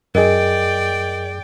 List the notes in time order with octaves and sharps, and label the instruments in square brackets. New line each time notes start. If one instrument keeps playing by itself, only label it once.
[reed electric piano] F#2 G#4 [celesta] A#4 D#5 [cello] D5 G5